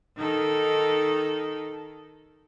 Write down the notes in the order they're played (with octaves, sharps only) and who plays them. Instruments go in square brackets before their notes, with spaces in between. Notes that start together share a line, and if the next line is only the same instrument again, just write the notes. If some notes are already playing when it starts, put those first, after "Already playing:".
[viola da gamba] D#3 D#4 A4